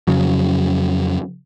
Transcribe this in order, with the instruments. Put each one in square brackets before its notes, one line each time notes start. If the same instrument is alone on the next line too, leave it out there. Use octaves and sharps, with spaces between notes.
[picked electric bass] F2 C#3 F#3